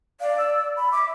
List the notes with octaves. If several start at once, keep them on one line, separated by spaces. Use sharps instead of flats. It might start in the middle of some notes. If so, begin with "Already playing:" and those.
D5 F5
E6
B5
E5 D6